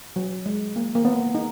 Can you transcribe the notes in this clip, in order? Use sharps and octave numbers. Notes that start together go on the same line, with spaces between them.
F#3
G#3
A#3
A#3
B3
D#4